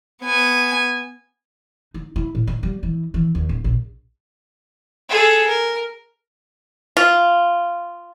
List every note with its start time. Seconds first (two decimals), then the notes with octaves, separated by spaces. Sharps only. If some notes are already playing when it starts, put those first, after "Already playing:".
0.23 B3 G#5
1.94 D#4
2.16 E4
2.35 A2
2.47 D#4
2.63 G3
2.83 E3
3.14 E3
3.35 D#2
3.49 D1
3.64 A#1
5.10 G#4 A4
5.47 A#4
6.97 F4